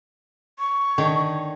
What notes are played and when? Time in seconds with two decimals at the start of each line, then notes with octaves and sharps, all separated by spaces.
0.59 C#6
0.98 D3 D#3 C#5